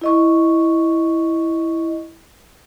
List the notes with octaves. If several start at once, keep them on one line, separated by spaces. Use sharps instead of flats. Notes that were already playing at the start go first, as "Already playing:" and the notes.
E4 D#5 C#6